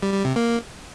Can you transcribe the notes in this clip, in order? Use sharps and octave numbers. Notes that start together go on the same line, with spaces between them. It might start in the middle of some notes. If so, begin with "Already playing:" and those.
G3
G3
C3
A#3